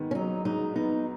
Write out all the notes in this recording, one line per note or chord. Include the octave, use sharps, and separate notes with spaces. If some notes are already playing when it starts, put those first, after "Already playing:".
Already playing: G#2 D#3 B3
C#4
F#3 D#4
G#2 D#4
B3 D#4